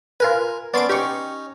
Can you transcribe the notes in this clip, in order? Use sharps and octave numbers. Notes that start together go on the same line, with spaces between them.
F4 A#4 B4 G#5
B3 C#4 D5 A5 C6 D7
C#4 D#4 G4 C#6